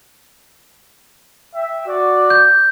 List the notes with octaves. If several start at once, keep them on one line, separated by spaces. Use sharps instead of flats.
E5 G5
F#4 D5
G6